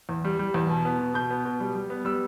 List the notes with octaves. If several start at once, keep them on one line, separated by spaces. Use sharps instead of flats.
E2
G3
G3
E2
B2
B3
B2
B2 G6
B3
B2
G3
G3
B3
G3 E6